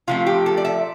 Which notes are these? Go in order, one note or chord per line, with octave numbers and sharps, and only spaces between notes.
C3 F3 A3 F4
G4
A4
D5
E5